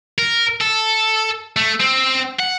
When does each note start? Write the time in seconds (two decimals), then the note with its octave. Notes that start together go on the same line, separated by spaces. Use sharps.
0.18 A#4
0.61 A4
1.57 A3
1.80 C4
2.40 F#5